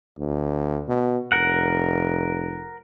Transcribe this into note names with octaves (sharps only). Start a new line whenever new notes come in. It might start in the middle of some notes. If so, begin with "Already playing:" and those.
D2
B2
F1 A#4 F#5